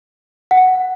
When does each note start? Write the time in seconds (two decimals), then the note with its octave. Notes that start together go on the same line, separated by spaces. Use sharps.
0.51 F#5